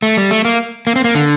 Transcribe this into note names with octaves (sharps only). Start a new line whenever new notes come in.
A3
G3
A3
A#3
A#3
C4
A#3
D3